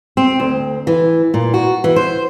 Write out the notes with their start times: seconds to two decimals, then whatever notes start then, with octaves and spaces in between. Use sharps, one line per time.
0.17 C4
0.40 D2
0.87 E3
1.34 A#2
1.54 F#4
1.84 E3
1.96 C5